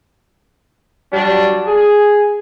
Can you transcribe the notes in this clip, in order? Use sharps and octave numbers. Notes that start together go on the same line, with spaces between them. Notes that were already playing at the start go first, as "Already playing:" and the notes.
F#3 G3 D4
G#4